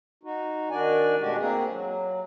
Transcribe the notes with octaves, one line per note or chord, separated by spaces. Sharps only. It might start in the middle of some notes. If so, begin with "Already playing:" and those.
D#4 F#4
D#3 D4 F#4 D5 G#5
B2 G#3 A3 D4 F#4 G4
A#3 C4 G#4
F#3